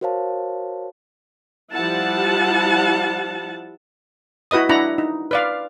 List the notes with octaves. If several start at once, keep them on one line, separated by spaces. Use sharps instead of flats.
F#4 A#4 C5 C#5 F5 A5
F3 G3 E4 G4 F#5 A5
E4 F#4 B4 D#5 D#6
D4 E4 F#5 A#5 B5
D#4
B4 D5 F5